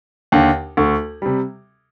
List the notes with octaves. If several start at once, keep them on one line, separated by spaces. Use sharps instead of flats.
D#2 D3
D2
C3 G3